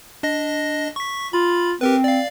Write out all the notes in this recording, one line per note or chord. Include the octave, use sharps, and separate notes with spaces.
D4 D#5 A#6
C#6 B6
F4 B5
C4 G4 A#4 B4
D5 F5